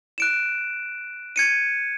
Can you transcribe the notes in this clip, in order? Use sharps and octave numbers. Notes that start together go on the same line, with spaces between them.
F#6 D7 E7
G#6 C#7 D#7